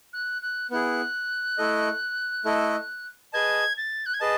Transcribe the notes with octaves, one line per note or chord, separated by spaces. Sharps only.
F#6
F#6
B3 E4 G#4 F#6
A3 E4 A4 D#5
A3 E4 A4 D#5
G#4 B4 D#5 A5 G#6
A6
F#6
G#6
G#4 B4 D#5 A5 A6